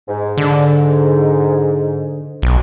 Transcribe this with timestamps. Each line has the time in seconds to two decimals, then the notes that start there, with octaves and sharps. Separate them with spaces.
0.08 G#2
0.38 D3
2.42 B1